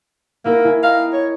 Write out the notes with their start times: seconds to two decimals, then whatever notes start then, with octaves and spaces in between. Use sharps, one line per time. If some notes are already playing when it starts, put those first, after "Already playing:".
0.45 A#3 B3 E4 A#4
0.64 E4 G#5
0.83 D#5 F5 G5 A#5
1.13 C#5